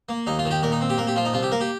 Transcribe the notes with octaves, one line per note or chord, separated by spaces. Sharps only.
A#3
D#2 D#4
F4
D#3
G4
A#2 A#4
D#4
C4
G4
A#2 A#4
G4
F3 F4
D#4
C2 F4
G4
A#3 A#4
G4